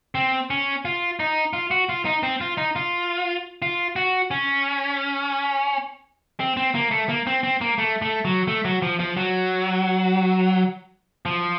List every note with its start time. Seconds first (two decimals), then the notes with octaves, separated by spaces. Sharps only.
0.15 C4
0.50 C#4
0.85 F4
1.20 D#4
1.53 F4
1.71 F#4
1.89 F4
2.05 D#4
2.23 C4
2.41 F4
2.57 D#4
2.76 F4
3.62 F4
3.96 F#4
4.31 C#4
6.40 C4
6.57 C4
6.75 A#3
6.91 A3
7.09 A#3
7.27 C4
7.43 C4
7.61 A#3
7.78 A3
8.02 A3
8.25 F#3
8.48 A3
8.65 F#3
8.82 F3
9.00 F3
9.17 F#3
11.26 F3